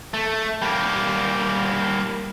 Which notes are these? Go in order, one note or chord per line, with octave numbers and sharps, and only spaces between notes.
A3
G3 A#3